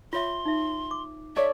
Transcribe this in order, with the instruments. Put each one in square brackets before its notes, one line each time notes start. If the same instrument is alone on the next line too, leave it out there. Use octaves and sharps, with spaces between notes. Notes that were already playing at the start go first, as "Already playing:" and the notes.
[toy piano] F4 C#5 E5 [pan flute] C6
[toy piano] D#4 E5
D6
[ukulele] A4 C#5 D5 [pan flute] E5